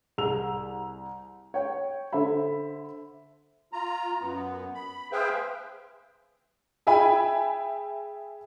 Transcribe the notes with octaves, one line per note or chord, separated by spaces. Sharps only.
C2 G#4 E6 F7
C#5 G5
D3 C5 E5 B5
F4 A#5
F#2 B3
B5
G#4 B4 C5 E5 F5 G5
G#4 E5 G5 G#5 B5